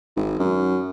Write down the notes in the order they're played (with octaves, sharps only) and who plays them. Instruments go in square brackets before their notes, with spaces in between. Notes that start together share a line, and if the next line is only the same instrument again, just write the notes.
[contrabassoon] G#1
F#2